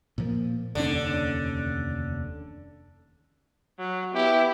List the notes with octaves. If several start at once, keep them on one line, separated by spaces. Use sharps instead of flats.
A#2 F3 A#3
F1 D#2 D3 C#4
F#3
B3 E4 G4